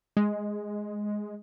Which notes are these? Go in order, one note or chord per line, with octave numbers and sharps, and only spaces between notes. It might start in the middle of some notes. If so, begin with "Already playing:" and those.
G#3